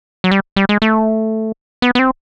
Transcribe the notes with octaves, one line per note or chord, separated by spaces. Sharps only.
F#3
G3
G3
G#3
A3
B3
B3
C4